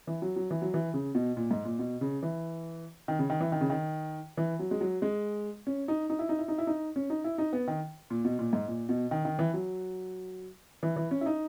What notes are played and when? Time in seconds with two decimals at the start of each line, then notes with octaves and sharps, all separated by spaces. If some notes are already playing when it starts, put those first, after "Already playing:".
0.07 E3
0.22 F#3
0.36 F#3
0.51 E3
0.62 F#3
0.74 E3
0.94 C#3
1.15 B2
1.37 A#2
1.51 G#2
1.65 A#2
1.79 B2
2.01 C#3
2.23 E3
3.08 D#3
3.19 C#3
3.30 D#3
3.41 E3
3.52 D#3
3.61 C#3
3.70 D#3
4.37 E3
4.59 F#3
4.71 G#3
4.81 F#3
5.02 G#3
5.67 C#4
5.88 D#4
6.10 D#4
6.19 E4
6.29 D#4
6.38 E4
6.48 D#4
6.58 E4
6.67 D#4
6.96 C#4
7.10 D#4
7.24 E4
7.38 D#4
7.53 B3
7.68 D#3
8.10 A#2
8.25 B2
8.39 A#2
8.53 G#2
8.68 A#2
8.89 B2
9.11 D#3
9.25 D#3
9.39 E3
9.54 F#3
10.83 E3
10.96 E3
11.11 C#4
11.21 E4
11.26 D#4